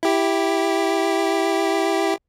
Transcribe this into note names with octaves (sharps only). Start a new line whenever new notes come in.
E4 G4